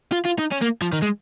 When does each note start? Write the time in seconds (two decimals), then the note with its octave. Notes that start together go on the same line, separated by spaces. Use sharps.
0.12 F4
0.26 F4
0.39 D#4
0.52 C#4
0.62 A#3
0.82 F3
0.93 D#3
1.02 G#3